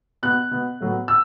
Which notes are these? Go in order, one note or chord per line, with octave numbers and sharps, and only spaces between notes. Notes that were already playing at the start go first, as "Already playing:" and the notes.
B2 B3 F#6
B2 B3
A2 F#3 B3
E6